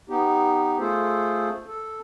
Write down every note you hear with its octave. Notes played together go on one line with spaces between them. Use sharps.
B3 D#4 G4
A3 F4 G#4 A4 C5
A4